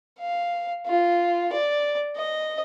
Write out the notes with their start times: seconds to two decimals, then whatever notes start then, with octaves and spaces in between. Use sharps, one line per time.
0.19 F5
0.86 F4
1.52 D5
2.16 D#5